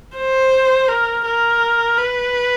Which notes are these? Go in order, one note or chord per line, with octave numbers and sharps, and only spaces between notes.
C5
A#4
A#4
B4